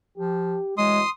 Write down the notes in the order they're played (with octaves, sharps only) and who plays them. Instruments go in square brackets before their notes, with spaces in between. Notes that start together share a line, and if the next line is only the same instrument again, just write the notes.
[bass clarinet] F3 [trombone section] G4
[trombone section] A1 E3 F#3 [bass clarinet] G#3 [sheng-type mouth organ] C6 D#6